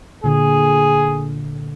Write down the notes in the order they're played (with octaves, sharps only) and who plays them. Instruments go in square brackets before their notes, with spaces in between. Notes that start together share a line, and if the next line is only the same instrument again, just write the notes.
[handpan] A#2 D3 [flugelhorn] G#4